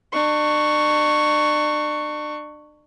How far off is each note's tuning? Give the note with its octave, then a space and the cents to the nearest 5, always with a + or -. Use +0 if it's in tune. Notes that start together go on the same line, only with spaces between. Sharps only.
D4 +35 C#6 +0